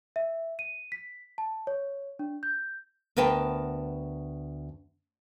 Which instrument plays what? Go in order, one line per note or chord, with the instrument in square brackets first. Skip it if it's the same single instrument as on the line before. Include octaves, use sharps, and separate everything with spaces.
[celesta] E5
D#7
B6
A5
C#5
D4
G6
[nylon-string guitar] D2 B3 A#4 B4 G5 A5